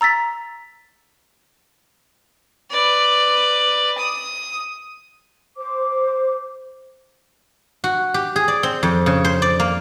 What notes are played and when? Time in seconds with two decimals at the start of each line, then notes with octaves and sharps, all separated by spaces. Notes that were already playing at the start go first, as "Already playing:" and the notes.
0.01 A#5 E6 A6 B6
2.71 B4 D5
3.98 D#6
5.57 C5 D6
7.84 F#4
8.14 G4
8.36 G#4
8.48 D5
8.63 C4
8.83 F2
9.06 C#3
9.24 C5
9.42 D5
9.60 A#3